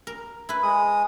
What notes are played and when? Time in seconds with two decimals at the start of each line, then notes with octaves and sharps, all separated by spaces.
0.07 A#4
0.49 E4 B4
0.63 G#3 D#6